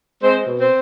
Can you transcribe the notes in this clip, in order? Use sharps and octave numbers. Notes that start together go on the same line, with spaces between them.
G#3 C4 C5
B2
C4 C5